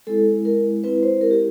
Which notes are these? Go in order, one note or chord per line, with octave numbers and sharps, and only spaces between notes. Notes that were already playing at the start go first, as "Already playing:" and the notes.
G#3 C4 E4 A4
A#4
G#3 C4 E4 B4
C5
A#4
G4